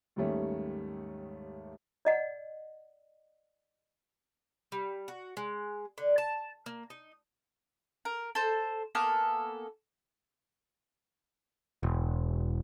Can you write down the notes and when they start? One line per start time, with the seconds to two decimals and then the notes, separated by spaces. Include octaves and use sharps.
0.16 D#2 G#2 D#3 G3 A3 C#4
2.05 D5 D#5 F#5
4.72 G3
5.08 F#4
5.37 G#3
5.98 D3
6.18 A5
6.66 A#3
6.90 D#4
8.05 A#4
8.35 A4 C5
8.95 A#3 B3 A4 G#5
11.83 E1